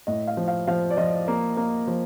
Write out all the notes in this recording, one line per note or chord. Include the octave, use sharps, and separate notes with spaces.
A2 D#5
F5
F3
F5
F3 F5
D5
F3 D#5
A#3
A#3
F3